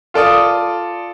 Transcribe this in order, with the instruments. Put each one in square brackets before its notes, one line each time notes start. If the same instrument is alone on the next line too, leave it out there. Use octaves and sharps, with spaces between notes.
[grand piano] F4 A4 D5 D#6